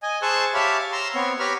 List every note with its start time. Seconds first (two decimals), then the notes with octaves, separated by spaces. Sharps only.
0.03 D#5 G#5
0.22 G#4 C5 A5 C#6 E6 F#6
0.54 G4 C#5 E5 F5 A5 B5
0.93 A#5 C6 E6
1.15 B3 C4 C#5
1.40 G4 B4 C#5 A#5 B5 F6